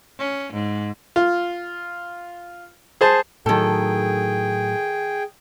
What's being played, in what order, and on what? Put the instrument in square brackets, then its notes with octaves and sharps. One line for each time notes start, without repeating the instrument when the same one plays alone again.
[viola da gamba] C#4
G#2
[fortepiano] F4
G#4 C5 A5
[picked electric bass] A2 F#3 [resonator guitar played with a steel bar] D#3 A4 [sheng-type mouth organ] G#4 G5